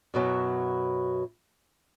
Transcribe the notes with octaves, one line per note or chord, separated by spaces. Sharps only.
F#2 B2 F#3 E4